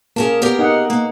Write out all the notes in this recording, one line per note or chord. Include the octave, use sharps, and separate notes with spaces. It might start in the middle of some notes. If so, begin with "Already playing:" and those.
A#3 C#4 G#4 A#4 A5
B3 G4 G#4 A#4
D#4 D#5 F#5
A#3